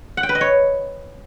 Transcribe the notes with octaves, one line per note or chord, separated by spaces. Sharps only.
F#5
G5
B4
D#5
C#5